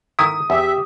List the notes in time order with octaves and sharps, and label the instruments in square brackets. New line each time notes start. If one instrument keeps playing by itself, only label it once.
[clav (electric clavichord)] D#3 E4 [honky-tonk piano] D#6
[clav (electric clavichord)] E2 [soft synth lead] G4 [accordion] E5